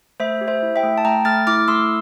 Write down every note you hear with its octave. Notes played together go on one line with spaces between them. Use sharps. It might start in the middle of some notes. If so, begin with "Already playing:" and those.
A3 C5 E5
G4
C5 E5
E4
E5 G5
A3
A5
A3 G5 A#5
A3 F6 A6
E4 D6 F6
A3 C6 E6